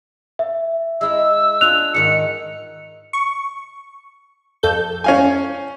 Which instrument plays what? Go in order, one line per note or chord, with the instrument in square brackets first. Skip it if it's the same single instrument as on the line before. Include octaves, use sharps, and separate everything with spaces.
[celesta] E5
[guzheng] G#3 E4 A#5 [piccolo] E6
[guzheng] D4 F4 G#5 [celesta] F#6 F7
[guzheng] G#2 D#3 F#5 [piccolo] C#7
[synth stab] C#6
F2 A4 G6
[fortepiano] C#4 F5 G#5